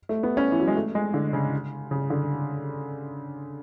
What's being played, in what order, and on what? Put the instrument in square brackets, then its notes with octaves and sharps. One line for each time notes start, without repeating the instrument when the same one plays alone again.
[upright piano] A3
B3
C#4
E3
F#3
G#3
A3
G#3
D3
C#3
C#3
D3